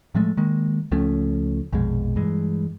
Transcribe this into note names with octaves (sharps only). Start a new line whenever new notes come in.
A2 F3 G#3 A3
D#3 G#3 A#3
C#2 F3 A3 C#4
A#1 F2 B2 G#3
G2 E3 G#3